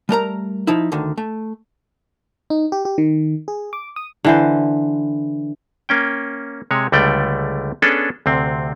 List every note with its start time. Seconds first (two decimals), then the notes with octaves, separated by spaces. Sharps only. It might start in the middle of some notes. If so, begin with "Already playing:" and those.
0.09 G3 A3 A#4 A#5
0.67 F3 D#4 E4
0.92 D2 D3 D#3
1.18 A3
2.50 D#4
2.72 G4
2.85 G4
2.98 D#3
3.48 G#4
3.73 D6
3.96 D#6
4.25 D3 E3 C5
5.89 A#3 C#4 G5
6.71 C3 G#3 C#5
6.92 C#2 D3 G3 A3 D5 G5
7.82 B3 C#4 D4 G#4 A4
8.26 D2 C3 C4